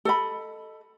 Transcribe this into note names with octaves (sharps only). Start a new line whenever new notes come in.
A4 D#5 B5